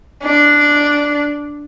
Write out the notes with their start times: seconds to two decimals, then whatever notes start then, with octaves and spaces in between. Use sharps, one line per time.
0.23 D4